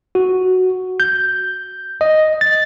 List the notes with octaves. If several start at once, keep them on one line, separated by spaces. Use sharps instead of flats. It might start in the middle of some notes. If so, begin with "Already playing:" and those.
F#4
G6
D#5
A6